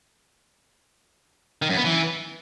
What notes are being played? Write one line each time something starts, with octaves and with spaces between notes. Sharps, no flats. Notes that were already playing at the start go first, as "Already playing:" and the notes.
D#3
F#2
B3
E3